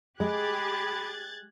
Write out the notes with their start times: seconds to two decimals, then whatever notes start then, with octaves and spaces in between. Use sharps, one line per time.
0.20 G#3 G4 G#4 B5 F#6 G#6 A6